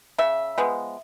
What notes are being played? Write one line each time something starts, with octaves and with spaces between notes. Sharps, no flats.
C#3 E5
F3 G#3 B3